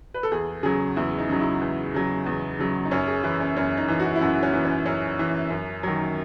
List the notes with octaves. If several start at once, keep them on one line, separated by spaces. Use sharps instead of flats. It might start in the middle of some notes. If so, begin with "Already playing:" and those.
B4
A4
E2 G#4
C#3 F#3 G#4
E2 E4
D#4
C#3 F#3
E4
E2
C#3 F#3
E2
C#3 F#3
D#4
F#2 C#4
G#4
E3 E4
C#4
F#2 C#4
D#4
E3
F#4
E4
F#2 F#4
C#4
E3
C#4
F#2 C#4
E3
F#2
D#3 F#3